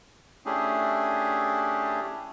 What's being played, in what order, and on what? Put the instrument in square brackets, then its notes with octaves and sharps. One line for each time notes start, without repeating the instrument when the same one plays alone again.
[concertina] A3 C#4 D4 E4 G4 G#4